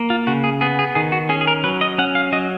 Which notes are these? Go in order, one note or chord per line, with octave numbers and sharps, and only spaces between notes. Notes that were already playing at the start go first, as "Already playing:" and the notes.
Already playing: A#3
F4
C#3 F#4
G#4
B3 G#4
G#4
D#3 G#4
F#4
C#4 G#4
G#4
A#4
F#3 B4
D#5
C#4 F#5
F5
F#3 D#5